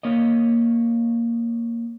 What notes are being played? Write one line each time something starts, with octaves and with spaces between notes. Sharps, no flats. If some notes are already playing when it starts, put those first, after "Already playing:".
A#3 C#5 D#5